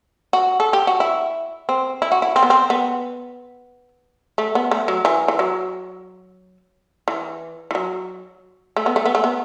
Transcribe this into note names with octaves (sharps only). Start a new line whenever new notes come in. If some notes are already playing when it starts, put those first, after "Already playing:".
F#4
A4
G4
F#4
E4
C4
E4
F#4
E4
C4
B3
C4
B3
A3
B3
A3
F#3
E3
E3
F#3
E3
E3
F#3
A3
B3
A3
B3
A3
B3